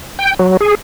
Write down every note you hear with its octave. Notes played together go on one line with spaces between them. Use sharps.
G5
F#3
G#4